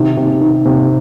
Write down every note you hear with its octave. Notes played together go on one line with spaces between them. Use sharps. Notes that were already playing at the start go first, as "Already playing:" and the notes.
Already playing: C3 D#3
C3
D#3
C3